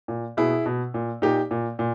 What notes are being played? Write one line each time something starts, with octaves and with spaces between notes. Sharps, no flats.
A#2
B2 E4 G#4
B2
A#2
A#2 D#4 G4
A#2
A#2